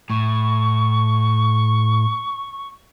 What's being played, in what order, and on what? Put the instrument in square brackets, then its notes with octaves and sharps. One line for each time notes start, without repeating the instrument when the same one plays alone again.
[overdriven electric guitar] A2 [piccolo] C#6